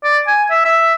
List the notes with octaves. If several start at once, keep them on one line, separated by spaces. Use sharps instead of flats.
D5
G#5
E5
E5